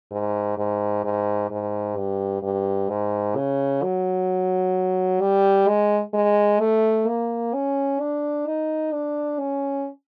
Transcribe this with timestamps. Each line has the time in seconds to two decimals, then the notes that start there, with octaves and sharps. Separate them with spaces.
0.11 G#2
0.58 G#2
1.04 G#2
1.51 G#2
1.97 G2
2.43 G2
2.89 G#2
3.36 C#3
3.83 F#3
5.21 G3
5.68 G#3
6.14 G#3
6.60 A3
7.07 A#3
7.54 C#4
8.00 D4
8.46 D#4
8.92 D4
9.39 C#4